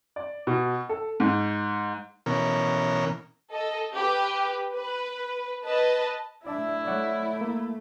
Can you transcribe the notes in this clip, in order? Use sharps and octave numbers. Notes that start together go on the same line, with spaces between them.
D5
B2
A4
G#2
B2 E3 C#4 A#4
A4 D#5
G4 B4
B4
B4 D#5 A5
A3 D4 E4 D5 E5 A5
A3 C#5 D5 F#5
A#3